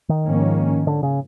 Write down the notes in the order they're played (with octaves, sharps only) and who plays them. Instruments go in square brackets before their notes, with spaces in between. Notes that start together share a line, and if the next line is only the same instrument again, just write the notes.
[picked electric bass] D#3
[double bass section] G#2 F3 A#3 C#4
[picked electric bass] D3
C#3